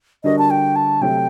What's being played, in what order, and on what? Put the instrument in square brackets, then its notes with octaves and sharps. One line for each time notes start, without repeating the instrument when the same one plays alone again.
[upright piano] D3 G3 D4 F#4 A#4 [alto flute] D#5
[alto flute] A5
G5
A5
[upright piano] C3 F#3 A3 [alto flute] G5